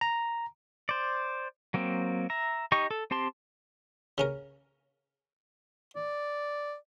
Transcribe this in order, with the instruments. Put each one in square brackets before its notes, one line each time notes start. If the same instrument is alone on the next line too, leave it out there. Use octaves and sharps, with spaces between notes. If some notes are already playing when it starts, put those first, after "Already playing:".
[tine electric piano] A#5
[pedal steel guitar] C5 D5
F#3 A#3 C4
E5 A#5
D#4 G4 D#5 C#6
A4
C4 G4 A5 C6
[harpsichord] C#3 C#4 A#4
[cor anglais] D5